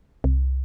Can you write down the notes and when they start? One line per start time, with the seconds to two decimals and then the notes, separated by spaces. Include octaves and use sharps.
0.24 C2